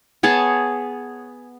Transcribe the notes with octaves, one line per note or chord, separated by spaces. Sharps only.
B3 G#4 C#5 A5